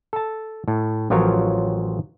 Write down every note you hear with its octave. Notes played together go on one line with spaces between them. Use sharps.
A4 A5
A2
A1 F3 F#3 F4 A#4 C#5